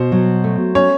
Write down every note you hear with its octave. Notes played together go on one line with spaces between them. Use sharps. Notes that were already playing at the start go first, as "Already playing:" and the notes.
Already playing: B2 C5
F#3
A3
C#4 C#5